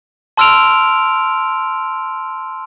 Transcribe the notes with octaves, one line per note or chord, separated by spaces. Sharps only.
A5 C6 E6 F6 D7 F7